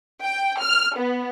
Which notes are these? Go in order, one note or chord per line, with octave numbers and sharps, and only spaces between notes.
G5
F6
B3